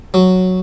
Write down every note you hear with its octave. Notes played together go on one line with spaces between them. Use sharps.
F#3